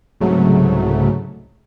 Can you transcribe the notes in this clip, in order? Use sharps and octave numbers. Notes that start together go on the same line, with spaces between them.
C2 G#2 C#3 F#3 A3